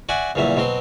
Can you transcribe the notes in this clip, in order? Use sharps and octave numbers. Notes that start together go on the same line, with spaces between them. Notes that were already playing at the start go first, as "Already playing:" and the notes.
F#4 D5 E5 F#5 G#5
A#1 E2 C#3 F#3 G3 E5
B2 F#3 C4 C6